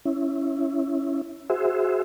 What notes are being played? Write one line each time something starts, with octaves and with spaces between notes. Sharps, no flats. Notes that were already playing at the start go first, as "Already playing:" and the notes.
C#4 E4
F#4 G#4 C5 E5